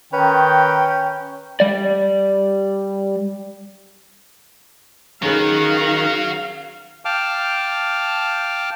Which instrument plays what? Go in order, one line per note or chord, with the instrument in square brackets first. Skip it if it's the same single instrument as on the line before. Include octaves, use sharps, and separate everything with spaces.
[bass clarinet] D#3 [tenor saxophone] C#4 [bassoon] B4 [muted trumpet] G5
[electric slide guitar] G3 D5
[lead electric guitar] D#3 [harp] C#4 G#4 B4 [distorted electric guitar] F#4 C#5 [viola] F5
[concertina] F5 G5 A5 D6 F6